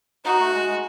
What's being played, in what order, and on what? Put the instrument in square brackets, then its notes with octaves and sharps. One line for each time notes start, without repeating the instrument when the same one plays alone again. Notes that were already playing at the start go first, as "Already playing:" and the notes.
[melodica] D#4 [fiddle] F#4
[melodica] A3
G#3
G#3